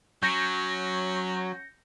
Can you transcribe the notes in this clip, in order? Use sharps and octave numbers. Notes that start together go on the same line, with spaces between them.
F#3 C#4 G6 A#6 C#7